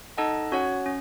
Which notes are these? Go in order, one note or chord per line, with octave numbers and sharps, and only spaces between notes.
D#4 A4 D#5 F#5 A5
C#4 F#4 C#5 F#5
C#4